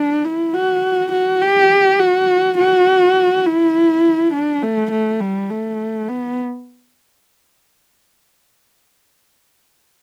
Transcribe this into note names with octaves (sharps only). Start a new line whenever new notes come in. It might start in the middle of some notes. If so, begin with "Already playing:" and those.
Already playing: D4
E4
F#4
F#4
G4
F#4
F#4
E4
D4
A3
A3
G3
A3
B3